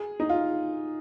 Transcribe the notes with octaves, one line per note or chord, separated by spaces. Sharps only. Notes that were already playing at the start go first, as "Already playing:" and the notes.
Already playing: G#4
D#4
F4